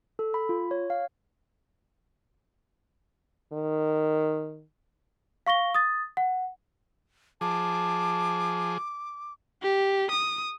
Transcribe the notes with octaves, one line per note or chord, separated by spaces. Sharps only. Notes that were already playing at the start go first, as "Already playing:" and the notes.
A4
B5
F4
C#5
F5
D#3
F5 C#6 A#6 G7
D#6 A6
F#5
F3 G#4 A5 D6
G4
D#6